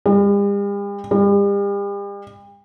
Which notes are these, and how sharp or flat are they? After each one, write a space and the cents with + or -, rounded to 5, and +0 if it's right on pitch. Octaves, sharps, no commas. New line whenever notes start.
G3 +45
G3 +40